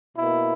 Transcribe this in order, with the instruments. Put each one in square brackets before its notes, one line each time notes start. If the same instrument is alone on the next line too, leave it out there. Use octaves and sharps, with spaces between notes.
[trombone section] B2 A#3 E4